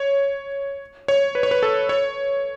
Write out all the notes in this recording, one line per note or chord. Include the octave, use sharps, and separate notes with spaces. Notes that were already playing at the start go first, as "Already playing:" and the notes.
Already playing: C#5
C#5
B4
C#5
B4
A4
C#5